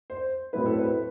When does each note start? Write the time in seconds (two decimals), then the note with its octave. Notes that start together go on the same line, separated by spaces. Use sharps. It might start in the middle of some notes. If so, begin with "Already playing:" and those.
0.10 C5
0.53 A2 F#3 C4 E4 B4
0.66 A4
0.78 B4